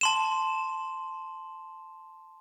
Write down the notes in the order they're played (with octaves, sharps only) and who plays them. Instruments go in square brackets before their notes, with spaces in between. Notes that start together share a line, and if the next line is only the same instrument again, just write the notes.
[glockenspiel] A5 C6 E7